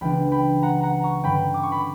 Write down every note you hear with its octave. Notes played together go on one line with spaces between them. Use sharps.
C#2 C#3 E3 B3 D4 G5 B5
G5 B5
F#5 A#5
F#5 A#5
A#5 C#6
G2 D3 F#3 C#4 G5 B5
D6
C#6
B5 D6